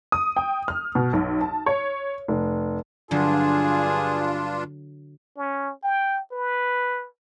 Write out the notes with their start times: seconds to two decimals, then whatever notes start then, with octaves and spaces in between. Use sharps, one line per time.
0.12 D#6
0.36 G5
0.68 F6
0.95 B2
1.13 B1
1.41 A5
1.66 C#5
2.28 F1
3.11 G2 D3 F#3 D4 F4 G#4
5.37 C#4
5.83 G5
6.32 B4